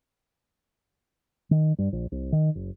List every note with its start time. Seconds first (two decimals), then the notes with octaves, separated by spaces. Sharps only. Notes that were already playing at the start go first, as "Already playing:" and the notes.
1.51 D#3
1.79 G2
1.93 A#1
2.12 C2
2.32 D#3
2.55 F#1